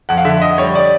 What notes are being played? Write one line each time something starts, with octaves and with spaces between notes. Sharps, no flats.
F2 F#5
F5
D3 E5
F2 D#5
G3 C#5
D5